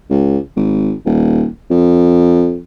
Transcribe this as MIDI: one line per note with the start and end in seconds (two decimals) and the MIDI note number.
0.10 0.38 37
0.56 0.92 32
1.05 1.46 27
1.71 2.58 41